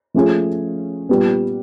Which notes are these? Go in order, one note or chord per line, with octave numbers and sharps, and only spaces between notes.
F3 A3 C#4 F4 G#4
A#2 G3 B3